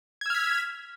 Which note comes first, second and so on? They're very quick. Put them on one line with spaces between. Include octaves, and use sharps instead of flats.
G#6 E6 F6 B6